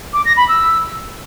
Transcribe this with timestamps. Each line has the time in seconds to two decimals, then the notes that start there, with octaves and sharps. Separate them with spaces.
0.13 D6
0.25 A#6
0.37 B5
0.49 E6